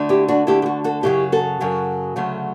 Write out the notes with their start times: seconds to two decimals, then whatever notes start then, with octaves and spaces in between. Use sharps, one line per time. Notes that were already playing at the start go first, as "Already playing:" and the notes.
Already playing: D2 D3 A3
0.09 E4 G4
0.28 D4 F#4
0.47 D2 D3 A3 E4 G4
0.62 G4
0.66 F#4 A4
0.84 F#4 A4
1.03 F#2 C#3 F#3 E4 G4
1.32 F#4 A4
1.60 F#2 C#3 F#3
2.16 D2 C#3 F#3 A3